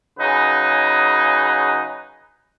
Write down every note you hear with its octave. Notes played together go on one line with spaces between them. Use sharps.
C#3 F#3 D#4 G#4 B4